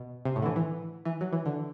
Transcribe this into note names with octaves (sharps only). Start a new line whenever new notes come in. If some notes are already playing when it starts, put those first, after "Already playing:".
Already playing: B2
C3
A2
D3
E3
E3
E3
F#3
E3
D3